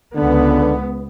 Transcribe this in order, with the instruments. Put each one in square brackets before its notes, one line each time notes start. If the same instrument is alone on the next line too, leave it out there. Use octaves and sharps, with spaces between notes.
[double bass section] C#2 B3 [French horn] D3